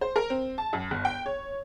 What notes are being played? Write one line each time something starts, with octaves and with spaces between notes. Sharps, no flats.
C5
A#4
C4
A5
F#2
G1
G5
C#5